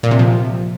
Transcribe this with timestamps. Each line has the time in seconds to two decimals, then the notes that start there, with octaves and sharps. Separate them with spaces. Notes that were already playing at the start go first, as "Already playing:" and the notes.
0.03 A#2
0.11 C3
0.19 F3